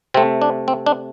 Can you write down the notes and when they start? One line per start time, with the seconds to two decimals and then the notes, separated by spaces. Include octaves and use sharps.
0.14 C3 A3 C4
0.42 D4
0.68 C4
0.86 D4